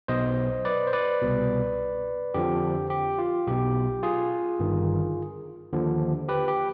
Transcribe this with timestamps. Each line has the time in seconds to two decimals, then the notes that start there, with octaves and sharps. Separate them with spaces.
0.08 B1 B2 C5 D#5
0.65 B4 D5
0.87 C5
0.93 B4 D5
1.22 C2 B2
2.34 F2 D3 F3 G4
2.90 G4
3.18 F4
3.47 B1 B2 G4
4.03 F4 G#4
4.59 G1 G2 D#3
5.73 D#2 D3 F3
6.29 G4 B4
6.48 G4